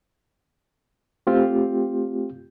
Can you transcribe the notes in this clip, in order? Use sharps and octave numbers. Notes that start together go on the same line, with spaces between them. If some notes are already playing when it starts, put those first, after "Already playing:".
A3 C4 F4 G4